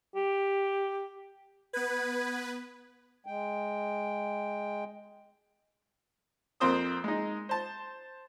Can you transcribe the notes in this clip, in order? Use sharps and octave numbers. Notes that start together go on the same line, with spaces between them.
G4
B3 B4 G#6
G#3 G5
F2 A#3 C4 C5 D#6
G#3 D#4
C5 A5